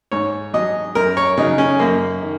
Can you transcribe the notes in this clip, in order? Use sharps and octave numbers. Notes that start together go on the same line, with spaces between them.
G#2 C#5
F#3 D#5
F#2 A#4
C#5
C#3 F#3 D#4
C#4
F#2 A#3
D#3